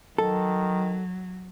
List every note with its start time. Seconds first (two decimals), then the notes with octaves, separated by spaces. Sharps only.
0.18 D#3 F#3 A4